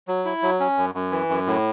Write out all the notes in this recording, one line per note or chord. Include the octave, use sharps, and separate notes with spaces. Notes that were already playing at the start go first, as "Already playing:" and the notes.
F#3
E4
F#3
C#4
F#2
F#2
E3
F#2
A2